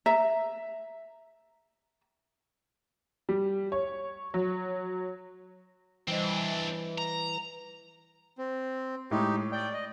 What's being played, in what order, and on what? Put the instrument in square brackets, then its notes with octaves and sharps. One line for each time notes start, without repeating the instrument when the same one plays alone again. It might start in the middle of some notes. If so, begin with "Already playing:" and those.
[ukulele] E5 A#5
[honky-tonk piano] G3
C#5
F#3
[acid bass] E3 [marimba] G3 C5 D#5 [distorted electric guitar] C4 D4
[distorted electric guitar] A#5
[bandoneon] C4
[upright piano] A2 [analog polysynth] G#3 [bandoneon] D#4 G4
[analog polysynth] D5 [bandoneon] G5
[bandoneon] D#5